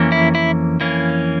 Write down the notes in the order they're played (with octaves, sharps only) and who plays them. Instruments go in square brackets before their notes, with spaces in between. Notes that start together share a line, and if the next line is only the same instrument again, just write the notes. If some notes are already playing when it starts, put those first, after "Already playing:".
Already playing: [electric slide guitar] F2 E3 A#3 C#4
E4
E4
F2 E3 A#3 C#4